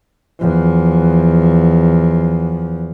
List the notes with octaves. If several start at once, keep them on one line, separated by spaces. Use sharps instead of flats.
E2 F3